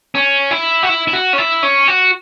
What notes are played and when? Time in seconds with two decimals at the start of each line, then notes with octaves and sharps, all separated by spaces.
0.15 C#4
0.51 E4
0.83 F#4
0.89 E4
1.08 E4
1.13 F#4
1.33 C#4
1.38 E4
1.63 C#4
1.88 F#4